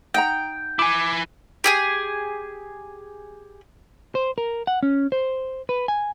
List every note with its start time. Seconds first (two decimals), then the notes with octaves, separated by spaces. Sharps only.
0.14 D#4 F#5 G5 A#5
0.79 E4 G#5 D6
1.64 G4 G#4 G#5
4.15 C5
4.38 A#4
4.67 F#5
4.83 C#4
5.12 C5
5.69 B4
5.88 G#5